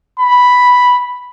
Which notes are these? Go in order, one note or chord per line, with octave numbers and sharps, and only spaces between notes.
B5